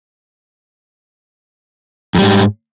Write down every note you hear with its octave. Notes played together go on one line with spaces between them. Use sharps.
F2 G#2 G3